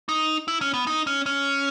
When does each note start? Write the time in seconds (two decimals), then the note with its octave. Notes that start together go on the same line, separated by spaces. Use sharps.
0.09 D#4
0.48 E4
0.61 C#4
0.74 B3
0.87 D#4
1.07 C#4
1.26 C#4